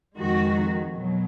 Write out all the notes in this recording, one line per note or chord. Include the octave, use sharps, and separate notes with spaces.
F2 D#3 G#3 F#4
B2 F#3